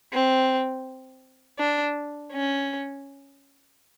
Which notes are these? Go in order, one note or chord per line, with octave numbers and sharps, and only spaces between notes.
C4
D4
C#4